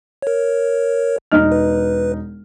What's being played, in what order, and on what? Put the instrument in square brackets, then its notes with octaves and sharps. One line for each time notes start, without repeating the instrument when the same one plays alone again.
[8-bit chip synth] A#4 C#5
[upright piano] E1 D#4 F6
[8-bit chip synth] B4